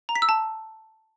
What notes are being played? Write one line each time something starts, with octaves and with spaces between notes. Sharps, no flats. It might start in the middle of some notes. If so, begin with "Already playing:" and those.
A#5
B6
E6
A5